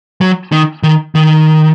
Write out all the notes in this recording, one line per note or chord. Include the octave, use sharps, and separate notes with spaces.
F#3
D#3
D#3
D#3